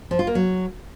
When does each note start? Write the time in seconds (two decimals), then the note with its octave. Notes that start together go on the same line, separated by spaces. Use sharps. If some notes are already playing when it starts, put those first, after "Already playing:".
0.11 F3
0.19 F4
0.27 A#3
0.35 F#3